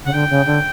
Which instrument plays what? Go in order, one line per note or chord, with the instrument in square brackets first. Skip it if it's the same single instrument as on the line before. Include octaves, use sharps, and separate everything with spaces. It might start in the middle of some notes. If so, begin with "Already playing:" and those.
[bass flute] C#3 [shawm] F#5
[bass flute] D3 [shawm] G5
[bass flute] C#3
D3